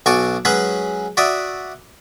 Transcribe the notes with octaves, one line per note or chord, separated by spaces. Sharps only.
B1 F#4 G#5 A5 C#6 D6
F#3 G#3 C#4 G#4 B4
F#4 D5 E5 D#6